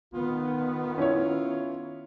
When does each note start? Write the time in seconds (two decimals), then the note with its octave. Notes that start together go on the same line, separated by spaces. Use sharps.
0.13 D#3 B3 F4
0.98 C#4 E4 C#5